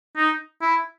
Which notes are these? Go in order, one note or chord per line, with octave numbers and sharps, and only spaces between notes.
D#4
E4